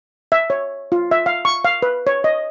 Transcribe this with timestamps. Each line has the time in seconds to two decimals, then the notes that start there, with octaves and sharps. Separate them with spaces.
0.32 E5
0.50 C#5
0.92 F4
1.11 E5
1.26 F5
1.45 C#6
1.65 F5
1.82 B4
2.07 C#5
2.24 D#5